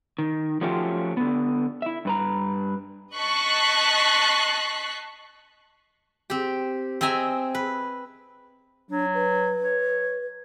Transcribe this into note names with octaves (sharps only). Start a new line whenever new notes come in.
D#3
F3 F#3 A3 C#4 F4 G4
D3 B3
E4 E5
G2 B4 A#5
D#5 A5 C#6 F#6 B6 C7
C4 G4
C4 D#5 E5 G#5 A#5
B4
F#3 D4
B4
C#5